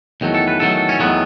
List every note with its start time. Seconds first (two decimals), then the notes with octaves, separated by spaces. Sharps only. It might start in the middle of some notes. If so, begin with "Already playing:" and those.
0.21 E2 D#3 F#3 A3
0.35 A4
0.48 B4
0.60 E2 D#3 F#3 A3 A4
0.89 C#4
1.00 E2 D#3 F#3 A3 B3